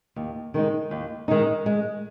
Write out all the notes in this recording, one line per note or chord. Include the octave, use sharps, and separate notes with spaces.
D#2
D#3 G#3 D#4
D#2
D#3 G#3 D#4
G#3